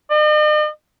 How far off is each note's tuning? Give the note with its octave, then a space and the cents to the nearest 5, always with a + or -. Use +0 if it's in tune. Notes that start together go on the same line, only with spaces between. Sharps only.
D#5 -45